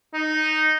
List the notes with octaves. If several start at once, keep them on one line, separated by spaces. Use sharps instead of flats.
D#4